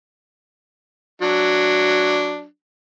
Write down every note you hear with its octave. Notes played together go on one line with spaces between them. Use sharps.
F#3 D4